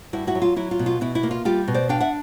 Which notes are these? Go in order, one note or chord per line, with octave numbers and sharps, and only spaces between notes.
G2 E4 F#4
E4 F#4
F#3
F4
F#3 E4
F4
B2
F4
B2 E4
E4
A#3
F4
G3 F4 G4
B2
C5 D5
D4 F5 G5
E5 F#5